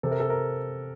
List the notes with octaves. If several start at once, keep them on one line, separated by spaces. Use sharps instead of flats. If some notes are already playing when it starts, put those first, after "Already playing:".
C3 A4
A#4
A4
A#4